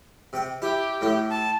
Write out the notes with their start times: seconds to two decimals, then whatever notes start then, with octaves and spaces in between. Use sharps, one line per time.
0.33 C3 G5
0.62 E4 G4
1.01 A2 E4
1.30 A5